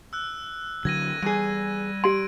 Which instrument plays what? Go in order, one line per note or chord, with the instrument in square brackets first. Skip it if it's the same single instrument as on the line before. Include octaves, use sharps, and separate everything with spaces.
[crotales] E6 F#6
[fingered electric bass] D3 F#3 [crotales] G#6 A#6 D#7
[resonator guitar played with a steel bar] E2 G#4 [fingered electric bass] G3
[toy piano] G4 C6 [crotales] D7